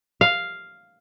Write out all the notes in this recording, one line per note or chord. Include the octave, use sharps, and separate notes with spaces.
F5